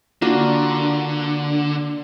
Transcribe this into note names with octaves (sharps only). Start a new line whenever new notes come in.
D3 A#3 D4 F4 F#4 D5